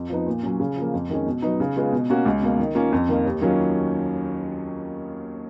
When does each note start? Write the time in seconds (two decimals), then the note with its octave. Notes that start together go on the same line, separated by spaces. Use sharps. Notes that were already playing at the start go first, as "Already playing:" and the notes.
Already playing: F2
0.10 F3 B3 D#4
0.27 A#2
0.43 F#3 C#4
0.59 C#3
0.77 F3 A#3
0.94 F2
1.10 D#3 G#3 C#4
1.26 B2
1.42 F#3 B3 D#4
1.60 C#3
1.77 G#3 B3 F4
1.92 B2
2.10 A#3 C#4 F#4
2.26 C#2
2.42 B2 A#3
2.59 D#3
2.75 A#3 C#4 F4
2.93 F2
3.09 D#3 A#3
3.25 D#2
3.41 D#3 F#3 C#4 F4